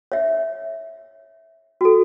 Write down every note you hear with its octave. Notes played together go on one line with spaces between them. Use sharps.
C#5 E5
F#4 A4